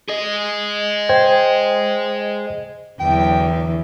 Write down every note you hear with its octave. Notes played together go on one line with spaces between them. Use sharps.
G#4 D#5
C5 G5 G#6
E2 D3 E3 F#3 G5